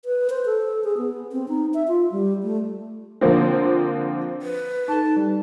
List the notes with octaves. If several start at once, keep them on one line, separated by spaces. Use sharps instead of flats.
B4
C5
A4
G#4
B3
C4
D#4
E5
F4
G3
A3
D3 F3 A#3 C4
B4
D#4 A4 A5
G3